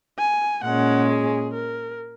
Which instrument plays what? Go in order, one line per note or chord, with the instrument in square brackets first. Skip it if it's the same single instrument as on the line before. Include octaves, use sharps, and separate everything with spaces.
[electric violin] G#5
[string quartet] A#2 G#3 C#4 [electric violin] F#5
[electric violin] G#4
A#4